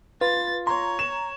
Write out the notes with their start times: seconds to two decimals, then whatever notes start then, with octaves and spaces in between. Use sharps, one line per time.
0.21 F4 B4 A6
0.67 C#5 A#5 C6
0.99 E7